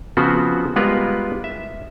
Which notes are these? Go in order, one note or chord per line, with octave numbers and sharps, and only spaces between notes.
C#3 F3 B3 C4 F#4 C5
G3 G#3 B3 F4 A#4 B4
E5